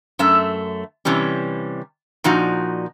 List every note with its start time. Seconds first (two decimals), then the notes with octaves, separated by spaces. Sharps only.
0.19 F#2 A3 E5
1.05 C3 E3 G3 C#4
2.24 A#2 F3 D#4 F#4